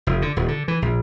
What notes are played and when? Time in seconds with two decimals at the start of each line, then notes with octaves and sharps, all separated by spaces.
0.07 F1
0.22 D3
0.36 D#1
0.48 D3
0.68 E3
0.82 A#1